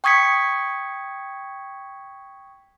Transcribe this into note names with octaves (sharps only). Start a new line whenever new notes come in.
G5 C#6 D#6 G#6 B6 C#7